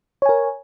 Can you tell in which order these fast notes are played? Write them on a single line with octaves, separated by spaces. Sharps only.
C#5 G#5 A#4